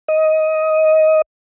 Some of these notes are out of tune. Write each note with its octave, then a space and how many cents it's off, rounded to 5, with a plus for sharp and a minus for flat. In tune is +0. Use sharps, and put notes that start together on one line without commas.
D#5 +15